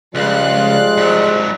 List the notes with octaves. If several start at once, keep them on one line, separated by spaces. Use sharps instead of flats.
C#2 F3 G3 G#3 D5 F5 F#6
G#2 F#3